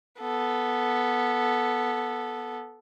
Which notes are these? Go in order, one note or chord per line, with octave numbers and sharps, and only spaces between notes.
B3 A4